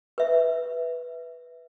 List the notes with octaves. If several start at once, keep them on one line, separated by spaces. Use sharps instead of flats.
B4 E5